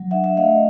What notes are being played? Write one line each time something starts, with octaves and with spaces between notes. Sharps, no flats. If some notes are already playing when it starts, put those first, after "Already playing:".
Already playing: F#3
D4 E5 F#5
E5 F#5
A3 D#5 F5